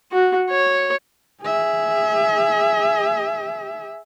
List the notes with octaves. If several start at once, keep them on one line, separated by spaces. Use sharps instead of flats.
F#4
C#5
G#4 E5